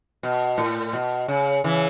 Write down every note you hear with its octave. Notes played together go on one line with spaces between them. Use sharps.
B2
A2
B2
C#3
C#3 E3